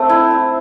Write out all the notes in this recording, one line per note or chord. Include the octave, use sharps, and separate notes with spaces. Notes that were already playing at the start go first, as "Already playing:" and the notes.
Already playing: A3 C4
E4
E4